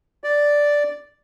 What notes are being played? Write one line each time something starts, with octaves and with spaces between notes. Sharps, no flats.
D5